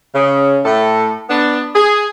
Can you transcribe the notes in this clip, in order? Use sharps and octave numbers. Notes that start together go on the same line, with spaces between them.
C#3
A2 A4
B3 D4
G#4